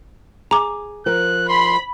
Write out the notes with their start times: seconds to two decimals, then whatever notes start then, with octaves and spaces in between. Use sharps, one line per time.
0.51 G#4 A#5 D6
1.06 F3 A#4 F#6
1.49 B5 C6